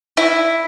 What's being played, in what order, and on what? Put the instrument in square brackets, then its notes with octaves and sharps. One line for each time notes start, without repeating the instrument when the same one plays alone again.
[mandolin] E4